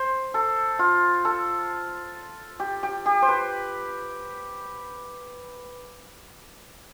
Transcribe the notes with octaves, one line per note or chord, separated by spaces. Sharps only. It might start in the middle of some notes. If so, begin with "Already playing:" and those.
Already playing: C5
A4
F4
A4
G4
G4
G4
C5
B4